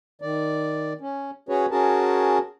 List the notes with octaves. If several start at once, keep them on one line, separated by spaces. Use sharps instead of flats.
D#3 D5
C#4
C#4 F#4 G#4 B4 C#5
C#4 F#4 G#4 A#4 A5